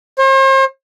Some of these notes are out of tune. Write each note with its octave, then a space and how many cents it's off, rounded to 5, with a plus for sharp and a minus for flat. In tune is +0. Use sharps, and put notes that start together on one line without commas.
C5 +40